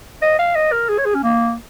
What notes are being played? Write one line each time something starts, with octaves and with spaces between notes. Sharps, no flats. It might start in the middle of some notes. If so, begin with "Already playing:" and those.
D#5
F5
D#5
A#4
G#4
C#5
G#4
C#4
A#3